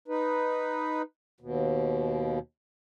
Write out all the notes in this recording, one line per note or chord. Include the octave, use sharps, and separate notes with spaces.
D#4 B4
D#2 B2